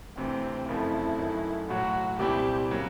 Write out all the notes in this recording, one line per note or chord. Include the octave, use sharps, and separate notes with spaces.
D2 C3 E3 C4
F#1 F2 C#3 F3 A3 E4
F#2 D#3 F#3 A3
B1 A2 F#3 F#4
C2 A#2 G3 C4 E4 G4
C#3 F#3 A#3